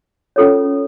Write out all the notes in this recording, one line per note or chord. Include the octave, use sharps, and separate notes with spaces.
C#4 F4 A4 C#5